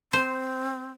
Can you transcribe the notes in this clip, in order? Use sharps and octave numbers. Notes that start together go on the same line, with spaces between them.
C4 C5